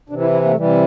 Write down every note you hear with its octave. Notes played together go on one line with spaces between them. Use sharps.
C3 E3 D4
E4
E4
A#3
A3
C3 E3 G3